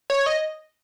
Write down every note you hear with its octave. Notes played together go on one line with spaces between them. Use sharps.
C#5
D#5